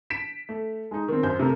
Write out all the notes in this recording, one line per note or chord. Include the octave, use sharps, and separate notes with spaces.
B6 D7 E7
A3
G#3 D#4
D#3 C4
F#2 C5 G6
C3 A3 A#4